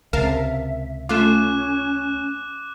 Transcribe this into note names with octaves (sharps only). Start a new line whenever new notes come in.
C#2 C3 A#4 E5 F5 A5
A3 C#4 F4 D6 F#6 E7